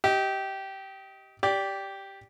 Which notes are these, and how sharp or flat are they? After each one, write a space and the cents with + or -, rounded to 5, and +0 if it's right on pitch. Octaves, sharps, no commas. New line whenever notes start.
G4 -15 D#5 +25
G4 +0 D5 -15